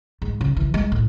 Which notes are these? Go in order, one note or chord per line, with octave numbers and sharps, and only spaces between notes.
G#2
C#3
E3
G#3
A2